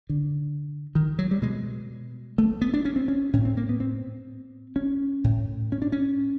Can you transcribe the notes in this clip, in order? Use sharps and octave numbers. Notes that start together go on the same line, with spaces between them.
D3
D#3
F#3
G3
B2 G#3
A3
B3
D4
C#4
C4
C#4
A2 C#4
C4
A#3
B3
C4
C#4
A2
C#4
D4
C#4